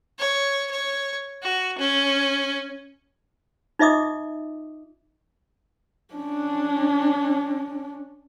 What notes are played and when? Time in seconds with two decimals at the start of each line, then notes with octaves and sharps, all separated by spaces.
0.19 C#5
0.71 C#5
1.43 F#4
1.78 C#4
3.79 D#4 F4 D#5 E5 D6 D#6
6.14 C#4 D4